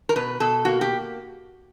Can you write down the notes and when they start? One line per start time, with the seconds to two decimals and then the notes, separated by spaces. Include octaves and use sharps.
0.09 A#4
0.16 B2 B4
0.40 B2 A4
0.65 A#3 F#4
0.81 G4